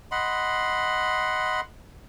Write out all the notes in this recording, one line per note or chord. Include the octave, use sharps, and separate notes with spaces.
D#5 F#5 B5 C6